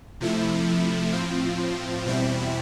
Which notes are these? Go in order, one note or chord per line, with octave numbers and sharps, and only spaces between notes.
C3 F3 A3 E4
A2 F3 C4 F4
E2 B2 G3 C4 E4